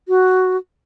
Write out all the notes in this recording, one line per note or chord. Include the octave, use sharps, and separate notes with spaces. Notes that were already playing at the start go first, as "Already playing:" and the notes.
F#4